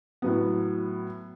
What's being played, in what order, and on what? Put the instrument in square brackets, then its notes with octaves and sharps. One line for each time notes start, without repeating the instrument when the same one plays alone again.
[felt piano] A2 F#3 B3